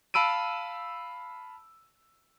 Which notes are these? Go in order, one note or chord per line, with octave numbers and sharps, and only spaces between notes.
F5 A5 B5 E6 D7 D#7